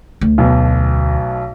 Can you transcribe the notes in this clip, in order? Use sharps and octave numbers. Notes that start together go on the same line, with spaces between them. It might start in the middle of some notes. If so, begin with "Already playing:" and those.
D2
B1 B2